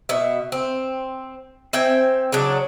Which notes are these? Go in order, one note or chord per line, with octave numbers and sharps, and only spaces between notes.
B2 E5
C4
C4 E5 G5 G#5
C#3 F#3 D4